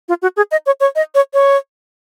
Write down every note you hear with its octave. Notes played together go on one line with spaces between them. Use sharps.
F4
F#4
G#4
D#5
C#5
C#5
D#5
C#5
C#5